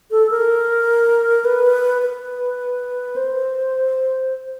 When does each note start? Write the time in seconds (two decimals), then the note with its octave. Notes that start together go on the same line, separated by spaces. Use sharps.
0.11 A4
0.30 A#4
1.45 B4
2.02 B4
3.16 C5